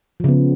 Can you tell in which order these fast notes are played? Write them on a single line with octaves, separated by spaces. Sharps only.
F3 C#3 B3